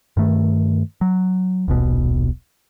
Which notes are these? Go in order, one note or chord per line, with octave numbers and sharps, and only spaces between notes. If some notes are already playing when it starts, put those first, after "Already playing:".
G2 D#3 A3
F#3
D#1 B1 B2